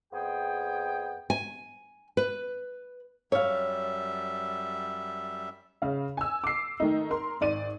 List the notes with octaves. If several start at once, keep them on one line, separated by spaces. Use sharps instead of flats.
F2 B3 G#4 G5
G#5
B4
F#2 G3 C#5 E5 F5
C#3 F5
G#5 E6
D6 C7
D#3 A3 D#4
A#4 C6
G#1 D5 D#7